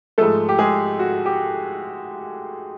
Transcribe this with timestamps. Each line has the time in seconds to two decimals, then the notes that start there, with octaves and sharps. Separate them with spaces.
0.18 G#2 F3 G#3 A3 A4
0.49 G4
0.59 G#3 G#4
0.99 F#4
1.26 G4